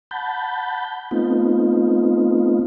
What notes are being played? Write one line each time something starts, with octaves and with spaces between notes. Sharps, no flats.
F#5 A5 B5 G6
A3 B3 C4 D#4 F4